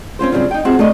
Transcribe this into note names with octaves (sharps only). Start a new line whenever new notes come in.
C4 C#4 F4 C5
C#3 E3 F#3 G3 C4 F4
D#4 G5
C4 F4 F#4 G#4 E5
A3 D4 D#5